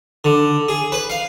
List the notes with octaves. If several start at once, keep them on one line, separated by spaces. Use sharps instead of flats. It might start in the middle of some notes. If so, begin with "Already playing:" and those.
D3
G#4
B4
F5